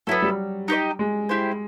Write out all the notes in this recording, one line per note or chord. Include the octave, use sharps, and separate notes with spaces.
F#3 B3 E4 A4
G3
D#4 G4 C5 D#5
G#3
E4 G4 C5